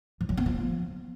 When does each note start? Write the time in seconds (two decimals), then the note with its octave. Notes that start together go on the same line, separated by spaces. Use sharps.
0.21 F3
0.29 F#3
0.37 B3
0.46 F3